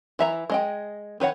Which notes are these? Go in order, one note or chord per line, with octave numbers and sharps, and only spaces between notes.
E3 E5 A#5
G#3 D#5 G5
D#3 B4 C#5 F#5